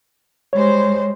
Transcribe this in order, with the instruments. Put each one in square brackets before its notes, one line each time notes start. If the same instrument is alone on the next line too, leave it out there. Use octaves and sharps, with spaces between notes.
[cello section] G3 G#3 C5 [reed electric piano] C#5